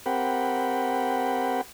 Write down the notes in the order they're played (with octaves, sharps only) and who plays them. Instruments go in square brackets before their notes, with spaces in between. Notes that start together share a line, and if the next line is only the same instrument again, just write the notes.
[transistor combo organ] C4 G4 A#4 F#5 G5 B5